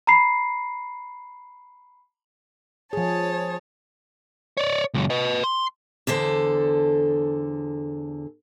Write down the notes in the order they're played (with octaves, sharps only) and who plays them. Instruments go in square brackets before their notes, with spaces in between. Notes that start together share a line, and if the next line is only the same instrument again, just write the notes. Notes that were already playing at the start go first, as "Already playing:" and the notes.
[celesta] A#5 B5 C7
[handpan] F3 G#4 [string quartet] C#5 A5
[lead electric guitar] C#5 D5
C#2 F#2
B4 D#5
C6
[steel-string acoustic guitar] E2 D3 A4 C5